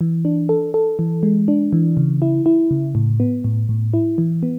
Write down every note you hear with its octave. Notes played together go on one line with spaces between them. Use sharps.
E3
D4
A4
A4
E3
G#3
D4
E3
C#3
E4
E4
C#3
A2
B3
A2
A2
E4
E3
B3